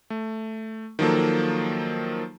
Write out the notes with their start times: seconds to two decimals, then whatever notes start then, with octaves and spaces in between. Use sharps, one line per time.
0.10 A3
0.99 D#3 F3 F#3 A#3 A4